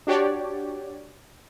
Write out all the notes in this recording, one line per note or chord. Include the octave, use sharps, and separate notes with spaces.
D4 F#4 G4 C#5 D5